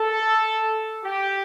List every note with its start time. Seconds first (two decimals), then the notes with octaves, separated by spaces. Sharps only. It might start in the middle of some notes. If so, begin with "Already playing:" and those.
Already playing: A4
1.04 G4